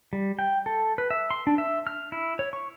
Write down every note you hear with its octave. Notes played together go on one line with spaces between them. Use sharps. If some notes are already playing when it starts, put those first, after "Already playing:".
G3
G5
A4
B4
E5
C6
D4
E5
F6
E4
C#5
C#6